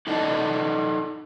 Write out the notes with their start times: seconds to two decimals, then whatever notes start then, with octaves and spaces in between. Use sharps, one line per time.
0.07 D#4 A4 D5 D#5 F#5 A5